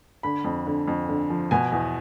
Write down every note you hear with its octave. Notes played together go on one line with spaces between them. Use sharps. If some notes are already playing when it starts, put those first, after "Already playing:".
D3 B5
F2
D3
F2
D3
F3
B2 G#5
E2